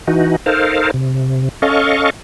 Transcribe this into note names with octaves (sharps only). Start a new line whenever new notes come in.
E3 D#4 F#4
D#4 A4 A#4 C5 F5
C3
C#4 A4 D#5 F5 C#6